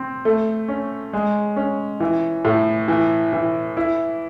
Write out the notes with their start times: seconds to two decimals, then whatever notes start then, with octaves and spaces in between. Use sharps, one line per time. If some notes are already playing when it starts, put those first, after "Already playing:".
Already playing: C4
0.25 A3
0.68 C#4
1.13 G#3
1.56 C#4
2.00 E3
2.45 A2
2.88 E3
3.33 E3
3.77 E4